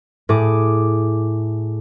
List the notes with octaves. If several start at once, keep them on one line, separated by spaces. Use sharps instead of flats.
A2 G#4 D6